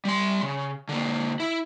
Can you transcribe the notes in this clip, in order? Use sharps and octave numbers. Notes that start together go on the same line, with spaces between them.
G3 C6
C#3
D3 A#3
E4